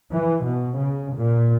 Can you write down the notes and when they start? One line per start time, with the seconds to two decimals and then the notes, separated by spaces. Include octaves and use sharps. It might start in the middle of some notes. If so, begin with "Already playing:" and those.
0.11 E3
0.44 B2
0.78 C#3
1.15 A#2